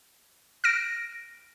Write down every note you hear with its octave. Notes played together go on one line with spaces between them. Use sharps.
F6 A#6 D7